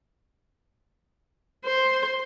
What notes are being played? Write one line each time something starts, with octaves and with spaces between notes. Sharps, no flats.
C5